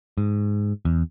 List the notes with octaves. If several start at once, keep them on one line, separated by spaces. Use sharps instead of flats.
G#2
E2